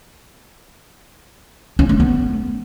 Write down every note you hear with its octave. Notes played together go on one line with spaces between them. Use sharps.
C#4
A3
B3